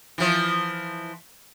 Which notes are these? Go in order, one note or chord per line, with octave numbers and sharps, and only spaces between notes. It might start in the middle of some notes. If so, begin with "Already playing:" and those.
E3 F3